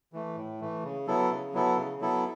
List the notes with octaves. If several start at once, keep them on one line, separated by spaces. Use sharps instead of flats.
E3 A3
A2
E3 A3
C#3
F#3 B3 E4 A4
C#3
F#3 B3 E4 A4
C#3
F#3 B3 E4 A4